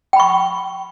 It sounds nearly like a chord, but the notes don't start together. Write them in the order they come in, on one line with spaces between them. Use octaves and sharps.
G5 B5 C#6